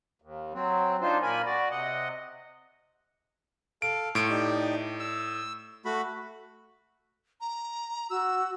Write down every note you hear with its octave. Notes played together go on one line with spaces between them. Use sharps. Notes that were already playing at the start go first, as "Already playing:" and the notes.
D#2
F#3 C4
D4 D#4 F4 C5
A#2 A#3 A#4 G#5 B5
F#4 D5
C3 D#5 F#5
A4 F5 D7
A2 C6 C#6 D7
D#4 G4 D5
E6
A3 F#4 B5
A#5
F#4 E6